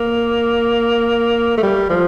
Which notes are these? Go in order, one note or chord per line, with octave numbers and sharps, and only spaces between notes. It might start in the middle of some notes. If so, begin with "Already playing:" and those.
Already playing: A#3
A3
G3
F3